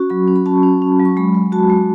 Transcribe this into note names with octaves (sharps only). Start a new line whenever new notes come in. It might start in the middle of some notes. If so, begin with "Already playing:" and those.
Already playing: C#4 F#4 C#6
F#3 B5
C#4
B5
C#4 A5
C#4
C#4
F#3
C#6
G#3 B5
G#3
F#4 A5
G#3